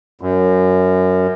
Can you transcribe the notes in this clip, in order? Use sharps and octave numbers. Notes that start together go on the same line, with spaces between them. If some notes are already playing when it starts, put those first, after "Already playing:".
F#2